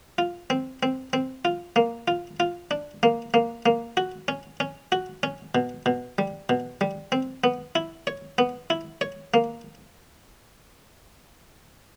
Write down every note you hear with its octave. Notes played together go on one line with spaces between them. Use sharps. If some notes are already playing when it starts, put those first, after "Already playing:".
F4
C4
C4
C4
F4
A#3
F4
F4
D4
A#3
A#3
A#3
F#4
C#4
C#4
F#4
C#4
B2
B2
G3
B2
G3
C4
B3
E4
C#5
B3
E4
C#5
A#3